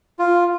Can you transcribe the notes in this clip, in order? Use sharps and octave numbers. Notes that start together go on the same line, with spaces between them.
F4